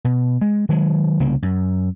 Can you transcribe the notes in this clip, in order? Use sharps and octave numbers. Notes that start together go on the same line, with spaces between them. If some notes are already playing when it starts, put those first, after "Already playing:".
B2
G#3
D#3 F#3 G#3
C2 C#3 G3 A#3
F#2